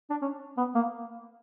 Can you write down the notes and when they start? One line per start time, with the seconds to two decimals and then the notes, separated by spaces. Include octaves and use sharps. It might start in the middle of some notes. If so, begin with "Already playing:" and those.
0.10 D4
0.22 C#4
0.57 B3
0.75 A#3